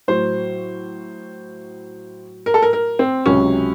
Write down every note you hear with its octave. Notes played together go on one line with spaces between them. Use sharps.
A2 F#3 C5
A#4
A4
A#4
A#4
C4
C#2 C3 F#3 C#4